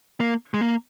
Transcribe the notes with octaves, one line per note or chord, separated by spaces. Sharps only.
A#3
G#3
A#3